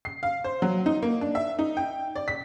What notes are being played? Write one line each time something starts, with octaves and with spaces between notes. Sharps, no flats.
C7
F5
C5
F#3
D#4
A#3
D4
E5
D#4
G5
D5
B6